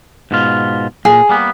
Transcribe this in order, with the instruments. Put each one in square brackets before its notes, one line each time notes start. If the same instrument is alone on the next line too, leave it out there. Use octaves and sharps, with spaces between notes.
[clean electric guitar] G#2 B2 F4
[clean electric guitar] A#2 [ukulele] G#4
[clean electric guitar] G3 A#3 B3